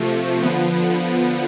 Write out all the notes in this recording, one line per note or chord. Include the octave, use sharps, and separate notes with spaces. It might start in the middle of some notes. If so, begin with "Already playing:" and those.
Already playing: C3 F3 A3
D3 F3 B3